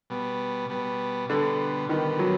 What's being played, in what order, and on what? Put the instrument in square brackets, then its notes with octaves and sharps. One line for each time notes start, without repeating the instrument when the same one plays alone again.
[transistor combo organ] B2 G3 B3
B2 G3 B3
[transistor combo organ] B2 G3 B3 [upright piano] D3
[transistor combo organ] B2 G3 B3 [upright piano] D#3
[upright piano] F#3